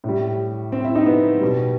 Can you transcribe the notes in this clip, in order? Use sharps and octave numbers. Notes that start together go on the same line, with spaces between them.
A2
G3
C4
E4
D#4
B3
B2 G3